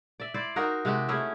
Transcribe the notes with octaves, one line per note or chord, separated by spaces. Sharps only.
D5 E5
E4 C5 D5
D#4 F#4 A#4
C3 G#3 F#4 G4
A3 C#4 E4 G#4